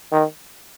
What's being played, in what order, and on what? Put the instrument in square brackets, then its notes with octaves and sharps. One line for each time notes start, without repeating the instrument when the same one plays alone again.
[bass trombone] D#3